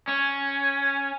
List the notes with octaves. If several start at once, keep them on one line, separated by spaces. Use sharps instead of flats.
C#4